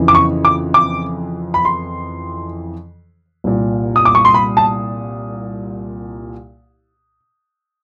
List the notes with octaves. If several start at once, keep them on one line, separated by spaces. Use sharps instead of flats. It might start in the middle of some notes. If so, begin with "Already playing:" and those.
Already playing: F2 C#3 E3
D6
C#6
D6
D6
B5
C6
C2 A#2
D#6
D6
C#6
C6
B5
A5